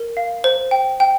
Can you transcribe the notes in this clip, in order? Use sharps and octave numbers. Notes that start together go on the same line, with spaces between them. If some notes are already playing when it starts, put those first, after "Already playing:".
Already playing: A#4
F5
C5
G5
G5